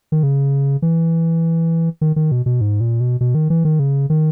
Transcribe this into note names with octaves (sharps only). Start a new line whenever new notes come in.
D#3
C#3
E3
D#3
D#3
B2
B2
G#2
A#2
B2
B2
D#3
E3
D#3
C#3
D#3